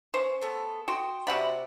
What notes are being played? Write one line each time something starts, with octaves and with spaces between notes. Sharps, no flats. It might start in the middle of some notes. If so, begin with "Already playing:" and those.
C#4 C5
A3 B3 A4
F#4 G5 C6 D#6
C3 F#4 D5 F#5 B5